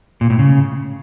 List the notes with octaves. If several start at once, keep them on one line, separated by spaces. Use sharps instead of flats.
A#2
A2
C#3